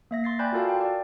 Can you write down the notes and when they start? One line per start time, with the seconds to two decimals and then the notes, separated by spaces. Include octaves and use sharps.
0.11 A#3 E5 A#6
0.24 C6 A6 C7
0.39 D5 G5 G#5 B5 F#6 G6
0.52 F4 F#4 A4 A#4 F5 A5
0.69 G5
0.81 D5